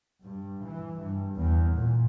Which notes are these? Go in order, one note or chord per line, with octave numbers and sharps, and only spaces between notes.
G2
E3
G2
E2
A#2